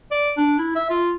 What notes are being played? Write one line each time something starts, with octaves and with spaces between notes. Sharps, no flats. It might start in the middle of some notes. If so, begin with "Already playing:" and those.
D5
D4
E4
E5
F4